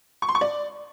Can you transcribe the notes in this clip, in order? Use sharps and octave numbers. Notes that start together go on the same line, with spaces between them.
C#6
C6
C#6
D5